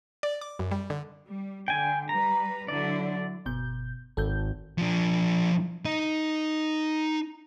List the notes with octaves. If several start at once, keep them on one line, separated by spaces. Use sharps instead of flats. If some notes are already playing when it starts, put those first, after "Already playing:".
D5
D6
F#2
G3
D3
G3
D3 G5 G#5
G3 B4 A#5
D3 F#3 E4 D5
G1 B2 G6
G#1 A4 G6
F3 D4
D#4